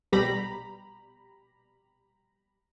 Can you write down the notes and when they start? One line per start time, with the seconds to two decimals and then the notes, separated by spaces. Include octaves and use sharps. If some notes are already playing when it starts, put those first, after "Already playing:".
0.12 A#1 B2 G3 G4 A#5 B5